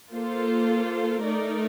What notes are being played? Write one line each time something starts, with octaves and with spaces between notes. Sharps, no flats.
A#3 F4 A4 C5
A3 D#4 A#4 D5